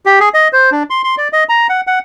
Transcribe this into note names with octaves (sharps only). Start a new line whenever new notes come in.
G4
G#4
D#5
C5
D4
C6
C6
D5
D#5
A#5
F#5
F#5